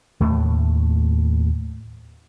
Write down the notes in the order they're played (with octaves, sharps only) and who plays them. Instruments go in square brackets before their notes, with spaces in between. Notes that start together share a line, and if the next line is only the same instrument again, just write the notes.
[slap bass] D#2 A2 A3